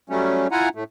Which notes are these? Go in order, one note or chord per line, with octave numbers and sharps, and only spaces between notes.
F#3 G3 A3 C#4
E4 F4 F#5 G#5 A#5
A2 A3